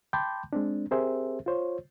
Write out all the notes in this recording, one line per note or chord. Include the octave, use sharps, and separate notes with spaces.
G5 A5 B5 C6 D6 G6
G#3 C4 D4
C4 G4 G#4 A#4 C5 E5
F4 C5 C#5